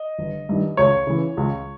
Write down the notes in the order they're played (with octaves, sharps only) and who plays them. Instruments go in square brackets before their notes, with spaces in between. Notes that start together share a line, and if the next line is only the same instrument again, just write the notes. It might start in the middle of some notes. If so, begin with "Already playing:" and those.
Already playing: [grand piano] D#5
G1
G2 D#3
C#2 C#5
C#3 E3
C#2